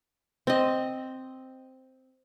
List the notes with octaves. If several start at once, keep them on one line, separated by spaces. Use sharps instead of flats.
C4 D#5